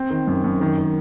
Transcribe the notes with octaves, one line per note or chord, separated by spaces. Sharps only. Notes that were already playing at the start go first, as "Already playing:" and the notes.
Already playing: C4
D#3
F#2
F#2
D#3
D#3